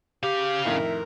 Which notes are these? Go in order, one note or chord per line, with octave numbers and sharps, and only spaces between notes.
C#3 G4 F5
F2 A2 D#3 A#4 E5